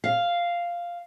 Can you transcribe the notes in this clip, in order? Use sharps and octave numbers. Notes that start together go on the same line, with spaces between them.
F5